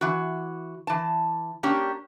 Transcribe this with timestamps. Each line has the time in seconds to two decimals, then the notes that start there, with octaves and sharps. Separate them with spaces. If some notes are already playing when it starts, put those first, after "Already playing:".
0.01 E3 F#4
0.87 E3 A5
1.63 A#3 C#4 D4 G4